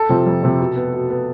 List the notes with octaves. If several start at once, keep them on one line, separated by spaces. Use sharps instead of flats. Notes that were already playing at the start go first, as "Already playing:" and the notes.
Already playing: A4
C3 F3 C4
F2
C3 F3 C4
B2
B3
B2
B3